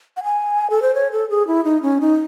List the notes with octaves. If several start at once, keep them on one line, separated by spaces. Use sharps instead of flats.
F#5
G#5
A4
C5
C#5
A4
G#4
E4
D#4
C#4
D#4